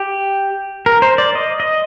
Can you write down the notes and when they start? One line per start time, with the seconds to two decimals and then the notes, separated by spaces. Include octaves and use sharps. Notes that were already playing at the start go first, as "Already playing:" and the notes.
Already playing: G4
0.86 A#4
1.02 C5
1.18 D5
1.35 D#5
1.60 D#5